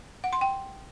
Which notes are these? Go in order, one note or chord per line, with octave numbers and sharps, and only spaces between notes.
F#5
C6
G5